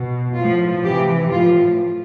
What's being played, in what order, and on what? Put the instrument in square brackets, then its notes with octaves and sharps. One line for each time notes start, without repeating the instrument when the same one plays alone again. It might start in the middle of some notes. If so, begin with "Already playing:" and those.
Already playing: [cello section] B2
A2 F3 F4
C3 E3 G4
A2 F3 F4